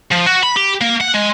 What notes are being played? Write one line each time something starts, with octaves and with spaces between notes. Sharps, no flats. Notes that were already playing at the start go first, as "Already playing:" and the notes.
F3
F#4
B5
G4
A#3
F#5
G#3